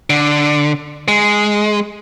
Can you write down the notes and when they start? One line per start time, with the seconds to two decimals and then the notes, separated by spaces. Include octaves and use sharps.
0.10 D3
1.08 G#3